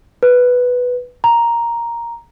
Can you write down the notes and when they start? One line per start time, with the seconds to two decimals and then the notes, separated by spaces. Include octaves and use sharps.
0.23 B4
1.24 A#5